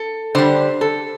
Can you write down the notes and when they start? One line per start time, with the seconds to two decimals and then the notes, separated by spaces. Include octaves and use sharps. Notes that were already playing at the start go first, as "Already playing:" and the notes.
Already playing: A4
0.35 D3 G3 C5
0.81 A4